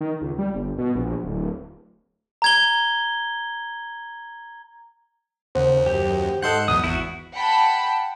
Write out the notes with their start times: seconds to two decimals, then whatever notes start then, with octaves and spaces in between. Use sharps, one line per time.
0.01 D#3
0.21 C#2
0.38 G3
0.54 G1
0.78 B2
0.95 A#1
1.24 D1
2.42 A#5 G#6 G7
5.55 D#2 C#3 C5 F#5
5.86 F#2 G4
6.42 G#2 A4 D#5 F#5 C6 F#6 G6
6.68 B1 E2 D#6
6.84 G#1 E2 E4 F#4
7.35 F#5 G5 A5 B5